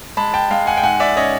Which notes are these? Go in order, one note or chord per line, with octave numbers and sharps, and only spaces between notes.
G#3 A5 B5
G5 A5
G#3 F5 G5
F#5 G#5
G5
G#2 F#5 G#5
D5 E5
C#4 C#5 D#5